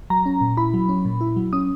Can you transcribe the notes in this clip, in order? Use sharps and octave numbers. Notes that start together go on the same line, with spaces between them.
F#3 A#5
C#4
A#2
E4 B5
F#3
C#4
A#2
E4
F#3
C#4 D#6